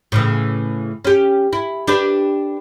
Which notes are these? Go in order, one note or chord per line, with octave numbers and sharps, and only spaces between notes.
A2 C#3 E3
C#4 G4
E4
D4 G4 B4